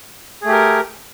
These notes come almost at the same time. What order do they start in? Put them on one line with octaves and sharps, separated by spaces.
G#4 A3 G4 A#4